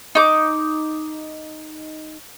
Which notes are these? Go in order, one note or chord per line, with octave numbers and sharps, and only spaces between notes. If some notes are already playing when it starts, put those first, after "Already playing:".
D#4 D6